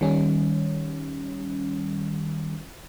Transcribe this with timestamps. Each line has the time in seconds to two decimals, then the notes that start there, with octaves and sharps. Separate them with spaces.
0.01 D#3 G3 C#4